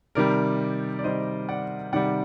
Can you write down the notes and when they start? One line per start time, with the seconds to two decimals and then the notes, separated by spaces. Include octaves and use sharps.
0.15 C3 D#3 G3 A#4 D5
0.99 D5
1.04 C3 D#3 G3 C5 D#5
1.49 D5 F#5
1.93 C3 D#3 G3 D5 F#5